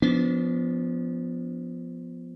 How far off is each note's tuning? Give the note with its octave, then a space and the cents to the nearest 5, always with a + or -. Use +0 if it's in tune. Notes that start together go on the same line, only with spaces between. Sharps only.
F3 +0 B3 +0 D4 -40